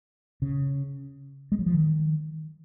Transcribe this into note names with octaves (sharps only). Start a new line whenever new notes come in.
C#3
G#3
F#3
F3
D#3